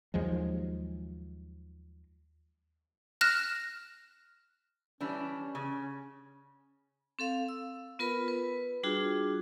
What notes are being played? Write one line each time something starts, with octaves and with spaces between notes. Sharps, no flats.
D#2 F3 F#3 G#3
F6 F#6 A#6 E7
E3 G3 C#4 D4
C#3
C4 A4 F5
E6
B3 F4 A#4 B4 B5
B4
G3 D4 F4 F#4 G#4